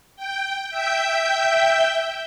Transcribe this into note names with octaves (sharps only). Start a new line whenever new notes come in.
G5
E5 G5 G6